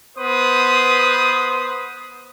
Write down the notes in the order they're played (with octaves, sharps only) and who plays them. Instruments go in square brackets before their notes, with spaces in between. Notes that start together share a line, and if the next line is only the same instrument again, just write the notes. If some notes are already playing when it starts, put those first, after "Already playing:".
[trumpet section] B3 B4 C5 D#6